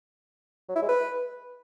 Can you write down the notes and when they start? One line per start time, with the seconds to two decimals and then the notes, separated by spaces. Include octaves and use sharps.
0.69 F#3
0.76 E4
0.82 G#3
0.89 B4